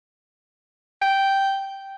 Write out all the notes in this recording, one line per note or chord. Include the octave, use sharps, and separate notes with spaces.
G5